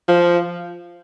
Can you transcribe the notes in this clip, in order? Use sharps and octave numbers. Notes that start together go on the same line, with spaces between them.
F3